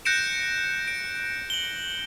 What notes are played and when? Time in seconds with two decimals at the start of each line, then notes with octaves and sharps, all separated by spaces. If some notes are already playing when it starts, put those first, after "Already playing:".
0.05 F#6 G6 A#6 C#7 D7 E7
0.88 D7
1.50 F#7 G7